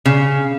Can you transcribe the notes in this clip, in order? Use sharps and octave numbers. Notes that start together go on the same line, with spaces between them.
C#3